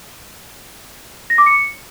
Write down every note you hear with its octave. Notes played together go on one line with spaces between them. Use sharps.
A#6
D6
C#7